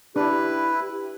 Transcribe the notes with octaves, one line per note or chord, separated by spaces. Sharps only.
D4 E4 G4 B4